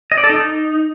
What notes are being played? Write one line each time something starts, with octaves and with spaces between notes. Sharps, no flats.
D#5
D5
A4
D#4